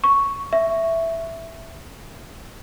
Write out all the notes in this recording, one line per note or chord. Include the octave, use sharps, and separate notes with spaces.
C#6
E5